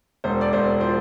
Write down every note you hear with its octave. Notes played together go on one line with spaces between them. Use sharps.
E1 C5
D5
E1 C5
F3 C5